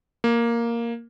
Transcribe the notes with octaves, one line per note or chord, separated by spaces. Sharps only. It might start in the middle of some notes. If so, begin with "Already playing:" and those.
A#3